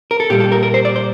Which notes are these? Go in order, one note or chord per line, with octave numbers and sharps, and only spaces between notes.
A#4
A4
A#2 G3 G4
A4
A#4
A#4
C5
D5
C5